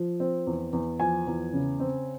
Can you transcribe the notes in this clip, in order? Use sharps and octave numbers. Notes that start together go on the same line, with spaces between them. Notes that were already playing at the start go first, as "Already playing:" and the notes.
Already playing: F3
C4
E2
E2
F3 G#5
E2
C#3
C4